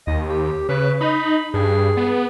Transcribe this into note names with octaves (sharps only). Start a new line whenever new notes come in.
D#2 D#5
G4
C#3 B4
D#4 B5
G2 G#4
B3